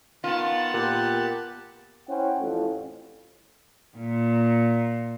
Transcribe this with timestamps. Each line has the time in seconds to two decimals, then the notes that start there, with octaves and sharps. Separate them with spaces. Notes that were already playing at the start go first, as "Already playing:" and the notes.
0.24 D#3 B3 F4 A5
0.74 A#2 G4 F#6
2.09 C#4 E4 C5 F#5 G5
2.39 A1 F2
3.96 A#2